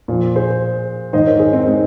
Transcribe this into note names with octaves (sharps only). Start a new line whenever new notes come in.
A#2 F3
G#4 C5
G#2 D#3 C5 D#5
A#4 C#5
G#4 C5
C4 D#4
G#3 C4